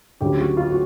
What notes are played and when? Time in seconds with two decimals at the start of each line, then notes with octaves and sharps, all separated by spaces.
0.21 D2 C#3 F#3 G4
0.40 F#4
0.57 F4
0.70 F#4